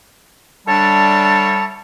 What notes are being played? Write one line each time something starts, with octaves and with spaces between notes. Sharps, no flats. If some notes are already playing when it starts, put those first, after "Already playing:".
D3 G3 D4 C#5 E5 A5